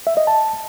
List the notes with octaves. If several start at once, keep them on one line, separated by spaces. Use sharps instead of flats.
E5
D#5
A5